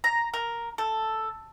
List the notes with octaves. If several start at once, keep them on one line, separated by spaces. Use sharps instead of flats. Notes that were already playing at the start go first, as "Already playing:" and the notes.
A#5
A#4
A4